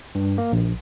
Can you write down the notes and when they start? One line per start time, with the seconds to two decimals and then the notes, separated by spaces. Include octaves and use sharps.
0.15 G2
0.38 A#3
0.52 A#1